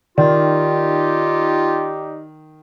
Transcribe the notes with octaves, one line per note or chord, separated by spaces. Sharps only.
D#3 D#4 F4 G4 D5